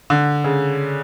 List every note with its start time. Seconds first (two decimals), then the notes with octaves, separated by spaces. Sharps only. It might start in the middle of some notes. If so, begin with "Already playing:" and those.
0.10 D3
0.44 C#3